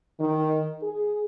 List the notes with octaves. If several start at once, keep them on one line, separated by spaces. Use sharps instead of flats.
D#3
G#4